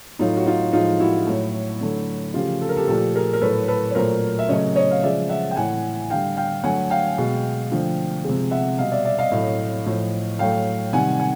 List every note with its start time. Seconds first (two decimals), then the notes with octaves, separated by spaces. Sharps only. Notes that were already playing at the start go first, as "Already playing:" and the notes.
0.19 A2 F#3 A3 D#4 F4
0.37 F#4
0.46 D#4 F4
0.73 A2 F3 G#3 D#4 F4
1.00 E4 F#4
1.27 A2 F#3 A3
1.81 D3 F#3 A3
2.34 C#3 F3 A3 F4 G4
2.61 A4
2.69 A#4
2.77 G4 A4
2.88 A#2 F3 A3 G4 A4
3.15 G#4 A#4
3.33 A#4
3.41 A2 F#3 A3 A4 B4
3.68 A4 B4
3.90 C#5
3.95 A#2 F#3 A3 A#4 C5
4.39 E5
4.49 C#3 F#3 A3 C#5 D#5
4.76 C#5 D#5
4.91 F5
5.03 C#3 F3 G#3 D5 E5
5.29 E5 F#5
5.51 G5
5.56 A2 E3 A3 F#5 G#5
6.10 D3 G3 F5 G5
6.37 F5 G5
6.64 D3 F#3 A3 F#5 G#5
6.90 F5 G5
7.18 B2 G#3
7.71 D3 F3 A3
8.24 C3 F3 G#3
8.51 E5 F#5
8.78 B2 G3 D#5 F5
8.92 D5 E5
9.05 D5 E5
9.18 D#5 F5
9.32 A2 F#3 A3
9.86 A2 F3 A3
10.39 A2 F#3 A3 F5 G5
10.93 C3 D#3 G3 F#5 G#5
11.20 F#5 G#5